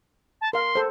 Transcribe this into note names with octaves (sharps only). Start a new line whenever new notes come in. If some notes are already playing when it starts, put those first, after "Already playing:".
A5
A#4 F5 C6
A4 C5